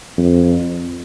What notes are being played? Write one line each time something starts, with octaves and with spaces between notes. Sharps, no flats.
F2